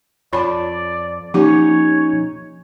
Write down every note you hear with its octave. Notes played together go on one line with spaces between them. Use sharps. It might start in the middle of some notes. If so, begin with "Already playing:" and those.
F2 F4 C#5 D5 G#5 A5 B5
F3 A#3 C#4 D#4 G4 C#5